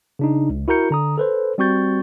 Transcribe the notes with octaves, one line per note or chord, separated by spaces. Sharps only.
C#3 D4 D#4
C#2
E4 F#4 A#4 A#5 G6 C#7
D3 A#5 D#6
A4 B4 C5
G3 C4 F#4 C#6 G6 A6